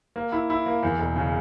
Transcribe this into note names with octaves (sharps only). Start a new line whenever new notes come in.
A#3
E4
E4
A#3
E2
E1
C#3